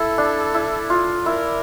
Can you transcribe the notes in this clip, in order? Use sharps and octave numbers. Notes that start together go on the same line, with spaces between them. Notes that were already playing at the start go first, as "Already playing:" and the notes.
Already playing: E4 A4
D4
E4
F4
E4 A#4